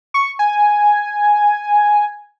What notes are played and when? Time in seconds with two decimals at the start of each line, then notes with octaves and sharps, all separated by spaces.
0.14 C#6
0.39 G#5